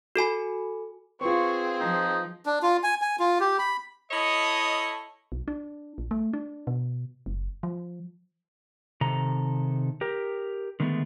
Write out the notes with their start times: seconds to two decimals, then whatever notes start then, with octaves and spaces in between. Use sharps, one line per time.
0.16 F#4 A4 G#5 B5
1.21 C4 F4 G#4 B4 C5 C#6
1.80 F3 D#4
2.46 D4
2.63 F4
2.83 G#5
3.02 G#5
3.19 F4
3.40 G4
3.59 B5
4.10 E4 A4 C#5 D#5
5.32 B1
5.48 D4
5.98 A#1
6.11 A3
6.33 D4
6.67 B2
7.26 F#1
7.63 F3
9.01 C3 D#3 A4 A#5
10.01 G4 A#4
10.80 D3 D#3 G#3 A3 B3